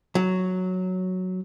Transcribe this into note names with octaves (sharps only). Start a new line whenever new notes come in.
F#3